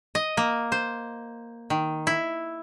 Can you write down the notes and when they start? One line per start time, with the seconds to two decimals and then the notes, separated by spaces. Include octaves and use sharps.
0.15 D#5
0.37 A#3
0.72 C5
1.70 D#3
2.07 E4